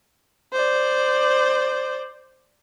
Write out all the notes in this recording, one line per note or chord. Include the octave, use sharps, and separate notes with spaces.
C5 D5